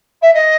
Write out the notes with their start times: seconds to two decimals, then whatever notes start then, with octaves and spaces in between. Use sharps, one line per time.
0.22 E5
0.34 D#5